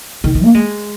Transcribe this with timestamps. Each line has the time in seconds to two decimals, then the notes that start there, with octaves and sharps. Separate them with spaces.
0.24 D#3
0.35 D#3
0.44 A#3
0.54 G#3